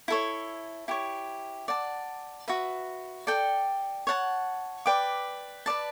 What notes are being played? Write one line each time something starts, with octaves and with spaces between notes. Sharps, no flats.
E4 A4 C#5
E4 G4 C#5
D5 F#5 A5
F#4 B4 E5
A4 D5 G5
C#5 F#5 A5
B4 D5 G5 D6
B4 D5 A5